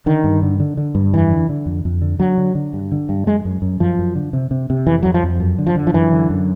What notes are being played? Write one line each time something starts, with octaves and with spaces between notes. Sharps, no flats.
D3 D#3
G2
D3
D3
D3
G2
F2 E3
D3
D3
F2
F2
D3
D3 F#3
D3
D3
G2
D3
G2
F#2 G#3
F#2
F#2
F#2 F3
F#2
D3
C3
C3
C3
F2 E3
F2 F#3
F3
F2
F#2
D3
F3
D3
F3
F#2 E3
D3
F#2